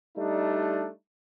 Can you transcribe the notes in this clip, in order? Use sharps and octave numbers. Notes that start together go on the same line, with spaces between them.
G3 A3 D4 D#4